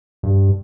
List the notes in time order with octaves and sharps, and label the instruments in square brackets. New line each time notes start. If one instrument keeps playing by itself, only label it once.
[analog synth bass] G2